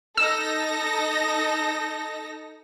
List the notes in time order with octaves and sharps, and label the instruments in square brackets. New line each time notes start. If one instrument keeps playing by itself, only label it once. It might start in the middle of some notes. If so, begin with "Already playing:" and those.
[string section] D#4 A4 A#6 [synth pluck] E6